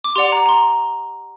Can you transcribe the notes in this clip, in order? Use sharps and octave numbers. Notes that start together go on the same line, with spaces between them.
D6
G4 D5 F#5 C6
A#5
A#5
C6